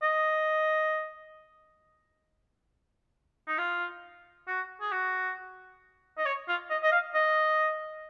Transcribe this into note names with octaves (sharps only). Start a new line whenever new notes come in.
D#5
D#4
F4
F#4
G#4
F#4
D#5
C#5
F4
D#5
D#5
F5
D#5